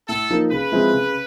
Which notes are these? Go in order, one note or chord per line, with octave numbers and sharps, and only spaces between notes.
A2 A4
F3 A#3 D#4
C#3 B4
F3 G#3 C4 E4
C#3